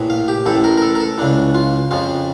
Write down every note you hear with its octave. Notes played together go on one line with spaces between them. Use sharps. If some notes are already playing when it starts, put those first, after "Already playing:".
Already playing: A#1 A2 E3
F5
G4
A1 A2 E3 A4
A#4
A#4
A4
A#4
A4
C#2 C#3 E3 D4
F4
F2 C#3 F3 F4